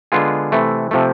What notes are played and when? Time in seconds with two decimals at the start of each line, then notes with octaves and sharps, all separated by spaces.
0.12 D3 G#3 B3 F4 G#4
0.52 C3 E3 A3
0.91 C3 F3 A3